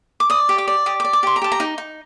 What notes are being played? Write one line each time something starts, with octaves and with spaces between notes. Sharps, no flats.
D6
D5 D#6
G4
D6
D5
G4 D#6
D6
D5
D6
G4 C6
A#5
G4 A5
A#5
D#4
D#4